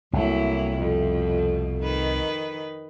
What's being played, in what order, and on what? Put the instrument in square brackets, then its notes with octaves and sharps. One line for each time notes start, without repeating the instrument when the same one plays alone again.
[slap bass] C2 A3 [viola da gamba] F#3 A#3 E4
[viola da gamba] F2 B2
D#3 B4